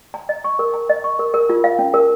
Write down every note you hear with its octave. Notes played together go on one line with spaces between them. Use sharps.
A#5
D#5
C#6
A#4
A#5
D#5
C#6
A#4
A#4
F4
F5
C#4
A#4